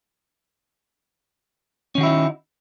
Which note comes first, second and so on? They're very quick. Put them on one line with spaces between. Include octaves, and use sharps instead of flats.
C#4 D#3 F#4 E4 D#4